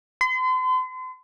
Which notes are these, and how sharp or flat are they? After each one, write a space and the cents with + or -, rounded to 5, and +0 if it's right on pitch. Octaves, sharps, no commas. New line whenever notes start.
C6 -40